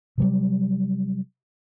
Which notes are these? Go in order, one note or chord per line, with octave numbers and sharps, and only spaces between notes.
C3 F#3 G3